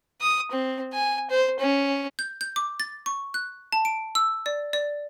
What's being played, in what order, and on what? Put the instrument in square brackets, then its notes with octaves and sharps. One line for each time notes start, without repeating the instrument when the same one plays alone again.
[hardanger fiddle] D#6
C4
G#5
C5
C#4
[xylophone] G6
G6
D6
A6
C#6
F#6
A5
D7
E6
D5
D5